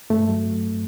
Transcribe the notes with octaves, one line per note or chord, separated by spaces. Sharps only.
G2 A3
F#3